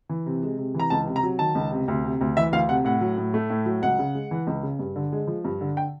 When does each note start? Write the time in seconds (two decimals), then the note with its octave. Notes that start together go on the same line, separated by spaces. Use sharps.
0.09 E3
0.26 C3
0.43 G#3
0.58 C3
0.74 E3 A#5
0.90 C#2 A5
1.07 C3
1.16 A#5
1.23 F#3
1.39 D#3 A5
1.55 C#2
1.71 C3
1.88 D2
2.04 C3
2.21 D2
2.37 E3 E5
2.53 D2 F5
2.69 C3 F#5
2.85 A2 F#5
3.01 F#3
3.17 A2
3.34 A3
3.50 A2
3.65 F#3
3.82 C#2 F#5
3.99 C#3
4.15 G#3
4.31 E3
4.47 C#2
4.63 C#3
4.79 G2
4.96 D3
5.12 G#3
5.27 F3
5.45 G2
5.61 D3
5.77 G5